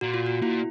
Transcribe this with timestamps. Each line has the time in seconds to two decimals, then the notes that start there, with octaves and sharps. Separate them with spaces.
0.01 A#2 F#4
0.14 F4
0.26 F#4
0.42 A#2 E4